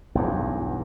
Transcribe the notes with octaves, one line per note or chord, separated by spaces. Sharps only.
B1 E2 G2